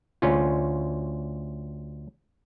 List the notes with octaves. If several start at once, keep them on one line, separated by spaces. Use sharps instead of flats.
D2 C#4 F4